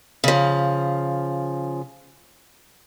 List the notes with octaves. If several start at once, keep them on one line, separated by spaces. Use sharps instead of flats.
C#3 F3